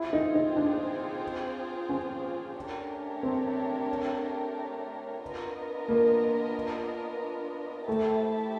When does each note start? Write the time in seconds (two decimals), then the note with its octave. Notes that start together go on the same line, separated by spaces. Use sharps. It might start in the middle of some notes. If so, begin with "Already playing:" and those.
Already playing: C4 E4 F4 G#4 C5
0.13 D#4
0.35 D#4
0.56 D4
1.89 C#4
2.56 A3 D4 G4 A#4 C#5
3.23 C4
5.22 B3 D4 F4 A#4 D#5
5.88 A#3
7.87 A3 E4 G4 C5 E5 A5